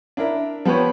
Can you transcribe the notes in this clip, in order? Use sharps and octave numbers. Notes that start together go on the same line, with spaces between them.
D4 E4 A#4
F3 B3 G4 B4 C#5